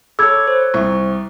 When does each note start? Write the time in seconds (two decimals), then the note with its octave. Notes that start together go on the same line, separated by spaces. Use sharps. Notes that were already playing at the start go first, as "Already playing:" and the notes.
0.19 A4 C#5 B5 D6 E6 G#6
0.47 C5
0.74 C2 C#6